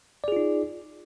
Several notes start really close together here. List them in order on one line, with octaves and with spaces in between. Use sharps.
D5 G#4 F4 D#4